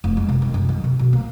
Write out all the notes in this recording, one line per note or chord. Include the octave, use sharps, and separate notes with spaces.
F1
G#3
C3
D#3
F#2
D#3
C3
B2
A#3